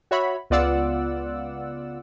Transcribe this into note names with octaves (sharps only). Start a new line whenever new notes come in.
F#4 C#5 E5 B5
C#2 B3 F4 D5 F#5 E6